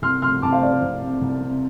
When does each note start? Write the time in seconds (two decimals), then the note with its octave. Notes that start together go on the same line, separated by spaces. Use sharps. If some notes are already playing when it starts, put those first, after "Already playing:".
0.02 C2 C6 F6
0.22 C3 C6 F6
0.42 C2 A5 D6
0.52 C5 F5
0.62 C3 D5
0.72 C5
0.82 C2
1.02 C3
1.21 C2
1.41 C3